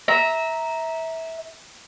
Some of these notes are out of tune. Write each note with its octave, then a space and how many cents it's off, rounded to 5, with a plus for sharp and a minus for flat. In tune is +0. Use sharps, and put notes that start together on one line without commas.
E5 -20 A#5 +0